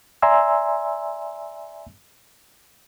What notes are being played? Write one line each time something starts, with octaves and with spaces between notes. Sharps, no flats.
D5 E5 G#5 A#5 C6 E6